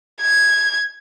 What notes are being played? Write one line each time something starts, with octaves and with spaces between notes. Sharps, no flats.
G#6